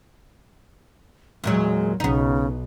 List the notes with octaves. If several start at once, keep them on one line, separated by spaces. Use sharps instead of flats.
E2 A#2 F#3 G#3
B1 C#3 B3 D#4